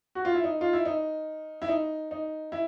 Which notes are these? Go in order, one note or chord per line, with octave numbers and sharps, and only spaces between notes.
F#4
F4
E4
D#4
F4
E4
D#4
E4
D#4
D#4
E4